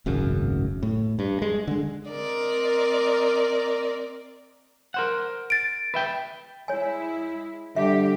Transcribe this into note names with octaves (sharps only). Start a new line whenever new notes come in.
D1 G#1 F#2 C#3
A2
G2
G#3
D3 G#3
C4 A#4 D5 D#5
A#4 C5 F#5
A6 D7
B4 E5 G5
G#3 E4 C#5 G#5
D3 G3 G4 E5